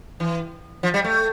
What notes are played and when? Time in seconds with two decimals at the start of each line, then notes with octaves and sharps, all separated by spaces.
0.20 E3
0.83 F3
0.94 G3
1.04 A3